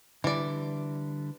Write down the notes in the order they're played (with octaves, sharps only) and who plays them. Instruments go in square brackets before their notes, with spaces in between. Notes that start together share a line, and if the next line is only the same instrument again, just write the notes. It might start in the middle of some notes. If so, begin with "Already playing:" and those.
[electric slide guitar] D3 G3 [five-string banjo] E3 D5